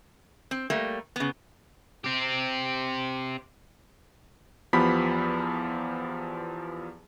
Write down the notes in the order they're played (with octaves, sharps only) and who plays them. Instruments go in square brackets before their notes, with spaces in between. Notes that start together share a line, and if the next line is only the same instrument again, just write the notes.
[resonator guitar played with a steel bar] C4
G3 A3 A#3
C#3 B3
[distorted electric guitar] C4 G4
[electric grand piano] E2 F3 B3 G4 B5 B6